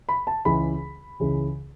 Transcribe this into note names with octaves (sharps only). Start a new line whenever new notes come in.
B5
A5
C#2 C#3 E3 B5
C#2 C#3 E3